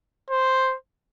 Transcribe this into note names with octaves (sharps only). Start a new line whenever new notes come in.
C5